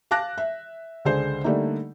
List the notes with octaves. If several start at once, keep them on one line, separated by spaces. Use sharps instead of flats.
F5 A5 D6 F#6 A#6
E5
C#2 D3 G#4 C5
D3 G3 A3 A#3 D#4